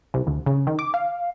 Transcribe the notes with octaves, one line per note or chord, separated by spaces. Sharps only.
C2
D2
C#3
D#3
D6
F5